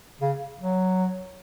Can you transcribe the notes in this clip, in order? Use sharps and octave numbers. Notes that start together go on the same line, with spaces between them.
C#3
F#3